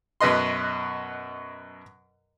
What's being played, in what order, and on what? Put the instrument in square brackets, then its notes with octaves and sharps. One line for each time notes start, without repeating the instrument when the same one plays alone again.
[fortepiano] F#2 B2 B4 D#5 C6